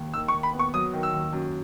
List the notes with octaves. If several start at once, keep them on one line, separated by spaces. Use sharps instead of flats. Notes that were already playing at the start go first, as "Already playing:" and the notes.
Already playing: D#2
D#3 E6
C#6
D#2
B5
B3
C#6
F#3 D#6
D#3
E6
D#2
F#2